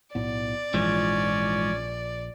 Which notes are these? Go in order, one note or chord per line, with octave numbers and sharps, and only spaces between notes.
B1 A2 B3 D5
A#1 G#2 E3 F3 C#4